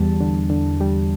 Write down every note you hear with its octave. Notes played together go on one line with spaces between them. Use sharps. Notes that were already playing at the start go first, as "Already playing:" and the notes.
Already playing: E2 G3 A5
D3
D3
G3